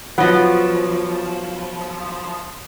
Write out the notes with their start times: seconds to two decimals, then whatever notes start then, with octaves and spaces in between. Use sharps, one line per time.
0.18 F3 F#3 B3 D#5